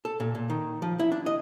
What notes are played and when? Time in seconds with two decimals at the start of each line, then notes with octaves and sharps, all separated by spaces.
0.05 A4
0.20 A#2
0.35 A#2
0.50 D#3
0.82 F3
0.99 E4
1.12 D4
1.26 D#5